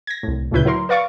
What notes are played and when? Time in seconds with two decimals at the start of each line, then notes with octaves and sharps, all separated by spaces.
0.07 G#6 A#6
0.23 C2 A2
0.51 D2 A#2 C#3 E4 B4 G6
0.65 F#3 E4 A#4 C6
0.89 B4 D5 F5 C#6 D6 A6